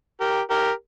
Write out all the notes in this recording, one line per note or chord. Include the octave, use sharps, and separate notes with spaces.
G4 A#4
G4 A#4